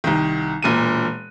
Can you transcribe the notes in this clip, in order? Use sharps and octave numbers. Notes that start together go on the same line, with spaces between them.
C2 D#3
E1 A#2 D#7